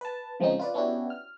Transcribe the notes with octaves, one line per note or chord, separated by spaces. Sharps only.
B4 A5
C#3 F3 G#3 C4 C#4 D#4
F4 B4 D5
B3 C#4 D4 E4 F#4 G4
F6